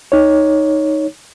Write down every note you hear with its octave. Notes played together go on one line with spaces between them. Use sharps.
D#4 C#5